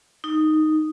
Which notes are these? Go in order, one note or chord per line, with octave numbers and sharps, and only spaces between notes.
D#4